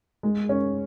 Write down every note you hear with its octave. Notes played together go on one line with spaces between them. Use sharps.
G#3
C#4